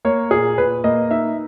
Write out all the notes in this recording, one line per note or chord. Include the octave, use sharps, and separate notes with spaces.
A#3 C#5
A#2 G#4
A#2 B4
A#3 D#5
D#4 E5